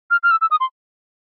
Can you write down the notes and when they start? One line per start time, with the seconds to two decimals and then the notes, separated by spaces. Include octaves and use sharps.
0.11 F6
0.23 F6
0.31 E6
0.41 E6
0.51 D#6
0.60 C6